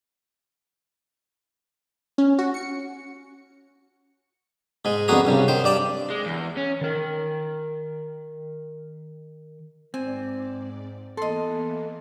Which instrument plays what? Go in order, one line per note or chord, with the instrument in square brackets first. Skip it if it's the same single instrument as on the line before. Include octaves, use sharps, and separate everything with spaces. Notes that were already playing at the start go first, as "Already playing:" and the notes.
[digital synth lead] C#4
F#4
C#7
[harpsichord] G#2 G#3
F2 D3 B3 F#4 G#4 A#5
C2 G2 C#3
D#3 C5
G2 D5 A5
[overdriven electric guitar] G#3
E2
C#4
[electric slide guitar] D#3 A#4
[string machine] G#2 D5 [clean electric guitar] C4 [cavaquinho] G#5
[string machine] E3 A#3 B3 [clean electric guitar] A4 [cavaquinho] D#5 C6